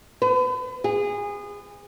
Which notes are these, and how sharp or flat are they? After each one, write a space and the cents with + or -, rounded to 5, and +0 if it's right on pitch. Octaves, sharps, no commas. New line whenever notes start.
B4 +40
G#4 -25